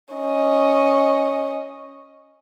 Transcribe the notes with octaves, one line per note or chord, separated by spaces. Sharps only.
C#4 D#5